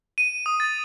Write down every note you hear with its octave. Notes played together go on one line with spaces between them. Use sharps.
D#7
D#6
A6